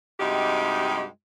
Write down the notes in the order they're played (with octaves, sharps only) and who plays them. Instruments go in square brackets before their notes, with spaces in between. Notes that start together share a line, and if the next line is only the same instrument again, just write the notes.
[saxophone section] G2 C3 G#3 D#4 F#4 G4